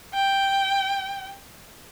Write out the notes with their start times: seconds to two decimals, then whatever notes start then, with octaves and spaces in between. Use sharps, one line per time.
0.14 G5